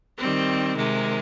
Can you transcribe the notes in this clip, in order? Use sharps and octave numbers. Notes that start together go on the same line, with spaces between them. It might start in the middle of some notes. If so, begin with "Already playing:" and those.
D#3 G3 C4
C3 D#3 G#3